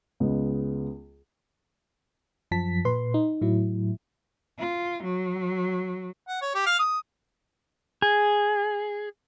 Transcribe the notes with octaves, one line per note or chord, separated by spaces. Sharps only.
C#2 G#3 B3 D#5
F#2 F3 A5 B6
A#2 B4 C6
D#4
A2 F#3 E4
F4
F#3
F#5
C#5
G4
F5
D#6
G#4